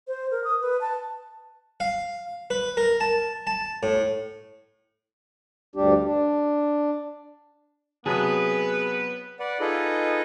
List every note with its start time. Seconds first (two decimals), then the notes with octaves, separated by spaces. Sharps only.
0.08 C5
0.31 A#4
0.44 D#6
0.61 B4
0.81 A5
1.80 F5
2.50 B4
2.77 A#4
3.01 A5
3.47 A5
3.83 A2
5.75 D2 G2 G3 D4 G4
6.05 D4
8.06 C3 F#3 B3 G#4 B4 A5
9.39 B4 D5 F#5
9.60 D#4 F4 G#4 A4 B4 D#5